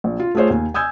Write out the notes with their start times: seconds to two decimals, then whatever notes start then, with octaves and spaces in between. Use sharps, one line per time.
0.04 A#1
0.20 F4
0.35 A3 F4 G#4 C5 C#5
0.50 D#2 G#5
0.74 G#5 D#6 E6 G6 G#6